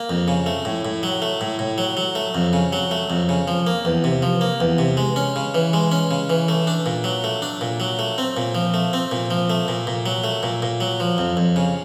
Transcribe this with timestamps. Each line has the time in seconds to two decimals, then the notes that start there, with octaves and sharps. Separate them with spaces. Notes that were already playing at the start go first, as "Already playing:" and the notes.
Already playing: A#3
0.10 F2
0.28 C#3
0.46 A3
0.65 A2
0.85 A2
1.03 F#3
1.22 A3
1.41 A2
1.59 A2
1.78 F#3
1.97 F#3
2.15 A3
2.35 F2
2.53 C#3
2.73 F#3
2.91 A3
3.10 F2
3.29 C#3
3.48 F3
3.67 A#3
3.85 E2
4.04 C3
4.22 F3
4.41 A#3
4.60 E2
4.78 C3
4.97 G#3
5.16 C#4
5.36 C#3
5.54 E3
5.73 G#3
5.92 C#4
6.11 C#3
6.30 E3
6.49 A3
6.67 D4
6.86 A#2
7.04 F#3
7.24 A3
7.42 D4
7.61 A#2
7.80 F#3
7.99 A3
8.18 C4
8.37 A#2
8.55 F3
8.74 A3
8.93 C4
9.12 A#2
9.31 F3
9.50 A3
9.68 A#2
9.87 A#2
10.06 F#3
10.24 A3
10.43 A#2
10.62 A#2
10.80 F#3
11.00 F3
11.18 F2
11.37 F2
11.56 C#3